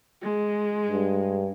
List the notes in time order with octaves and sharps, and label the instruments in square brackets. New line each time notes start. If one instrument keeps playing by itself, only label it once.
[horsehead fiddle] G#3
[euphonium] G2